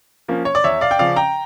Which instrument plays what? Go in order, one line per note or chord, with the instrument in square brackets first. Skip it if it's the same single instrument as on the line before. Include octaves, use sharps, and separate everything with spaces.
[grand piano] F3 A#3 C#4
C#5
D5
E2 C#5 E5
D5 F5
G5
C#3 F3 C#4 D5 F5
G5 A#5